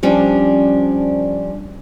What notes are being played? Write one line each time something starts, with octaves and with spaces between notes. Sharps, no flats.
F3 G3 C#4 D4